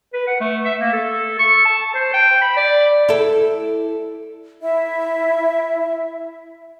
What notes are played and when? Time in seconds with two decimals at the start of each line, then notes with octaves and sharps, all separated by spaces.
0.13 B4
0.27 F#5
0.40 A3
0.65 E5
0.80 A#3
0.93 A4
1.39 C#6
1.65 A5
1.94 C5
2.14 G5
2.41 B5
2.56 D5
3.09 E4 A4
4.61 E4 E5